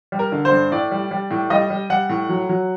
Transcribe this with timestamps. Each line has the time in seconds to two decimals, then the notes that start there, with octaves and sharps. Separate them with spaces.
0.12 G3
0.19 A#4
0.32 D3
0.45 C5
0.51 G2
0.72 A2 D5
0.91 G3
1.11 G3
1.31 A2
1.50 G3 D#5
1.70 G3
1.90 G3 F#5
2.10 A2
2.29 F#3
2.49 F#3